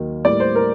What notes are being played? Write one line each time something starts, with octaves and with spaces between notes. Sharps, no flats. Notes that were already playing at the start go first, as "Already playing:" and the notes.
Already playing: D#2 D#3 F#3 A#3
A2 G3 A#3 D5
C5
A#4